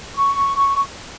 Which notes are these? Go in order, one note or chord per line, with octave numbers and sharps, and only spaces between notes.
C#6